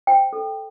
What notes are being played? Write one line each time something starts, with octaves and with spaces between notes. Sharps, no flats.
C5 G5
A4